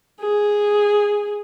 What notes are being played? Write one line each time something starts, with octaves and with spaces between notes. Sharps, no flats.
G#4